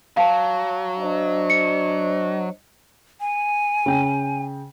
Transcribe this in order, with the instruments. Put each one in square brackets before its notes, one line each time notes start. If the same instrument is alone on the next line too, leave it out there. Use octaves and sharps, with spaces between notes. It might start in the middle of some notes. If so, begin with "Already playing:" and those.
[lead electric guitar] F#3 [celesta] F5 A5
[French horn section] D4 C5 D#5
[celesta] C#7
[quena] G#5
[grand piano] C#3 G5